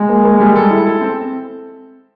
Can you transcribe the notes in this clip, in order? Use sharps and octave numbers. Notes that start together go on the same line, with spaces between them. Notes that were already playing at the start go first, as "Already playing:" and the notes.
Already playing: G#3
A#3
A#3
G3
A4
E4
A4
C4